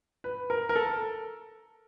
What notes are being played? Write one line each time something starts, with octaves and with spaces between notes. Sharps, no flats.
B4
A#4
A#4
A4